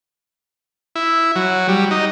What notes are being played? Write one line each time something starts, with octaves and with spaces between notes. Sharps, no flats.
E4
F#3
G3
D#4